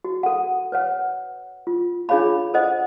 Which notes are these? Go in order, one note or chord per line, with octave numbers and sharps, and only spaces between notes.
F#4
A4 F#5
B4 C#5 F#5
F4
D4 F4 G#4 C#5 F5 B5
A4 C5 D#5 F#5